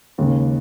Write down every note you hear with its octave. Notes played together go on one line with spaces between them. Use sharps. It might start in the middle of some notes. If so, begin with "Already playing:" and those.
D#2 C#3 G#3